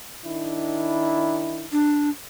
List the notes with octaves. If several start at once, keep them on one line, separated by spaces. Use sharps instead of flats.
D#3 D4 E4
D4